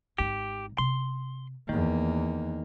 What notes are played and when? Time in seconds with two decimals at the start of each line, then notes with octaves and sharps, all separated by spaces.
0.18 G#1 D#4 G4
0.78 C3 C6
1.69 E2 D#3 A3 A#3